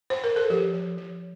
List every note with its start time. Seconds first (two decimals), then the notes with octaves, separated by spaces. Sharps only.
0.10 C5
0.24 A#4
0.36 A4
0.50 F3 G4
0.73 F3
0.98 F3